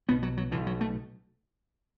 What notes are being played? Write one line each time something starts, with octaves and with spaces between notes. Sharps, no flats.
B1 B2 B3
F#3
F#3
B1 B2 E3
F#3
A3